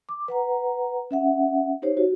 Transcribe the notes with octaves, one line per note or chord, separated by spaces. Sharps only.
D6
B4 F#5 A#5
C#4 E5 F#5
D#4 G4 C5 C#5
F#4